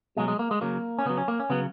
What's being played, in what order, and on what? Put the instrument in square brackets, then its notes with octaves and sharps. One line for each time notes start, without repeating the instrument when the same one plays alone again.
[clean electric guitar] B2 F#3 G#3
G#3
A#3
G#3
C#3 F#3 A#3
C#4
C#3 F#3 B3
C#4
A#3
C#4
C#3 F#3 B3